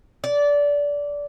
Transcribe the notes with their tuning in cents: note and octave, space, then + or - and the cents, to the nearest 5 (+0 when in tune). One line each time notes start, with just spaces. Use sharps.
D5 -20